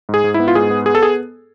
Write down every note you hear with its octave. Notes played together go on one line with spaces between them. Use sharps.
G#2 G#4
G#2
E4
B3
F4
G#2 G#4
B3
B3 G#4
A4
G#4